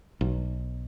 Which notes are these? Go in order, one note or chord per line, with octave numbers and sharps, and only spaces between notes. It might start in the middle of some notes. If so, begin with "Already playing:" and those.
B1